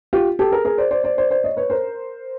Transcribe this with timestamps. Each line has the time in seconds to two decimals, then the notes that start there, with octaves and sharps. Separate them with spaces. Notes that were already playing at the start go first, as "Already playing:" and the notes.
0.13 F4 G4
0.39 G4 A4
0.52 G#4 A#4
0.65 G#4 A#4
0.78 C5 D5
0.91 C5 D5
1.04 C5 D5
1.18 C5 D5
1.31 C5 D5
1.44 C#5 D#5
1.57 B4 C#5
1.70 A#4 C5